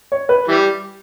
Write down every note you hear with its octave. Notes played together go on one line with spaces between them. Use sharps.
C#5
B4
E3 G3